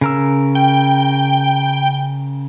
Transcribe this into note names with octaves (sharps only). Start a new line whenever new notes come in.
C#3 A#4 E6
G5